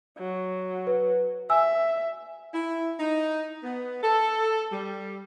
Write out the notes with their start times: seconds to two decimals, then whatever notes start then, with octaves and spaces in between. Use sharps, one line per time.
0.18 F#3
0.87 B4
1.50 E5 G#5 E6
2.54 E4
3.00 D#4
3.63 B3
4.03 A4
4.73 G3